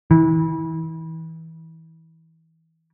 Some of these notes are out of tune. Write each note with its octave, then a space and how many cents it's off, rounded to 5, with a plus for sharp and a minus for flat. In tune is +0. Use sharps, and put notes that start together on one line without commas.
E3 -30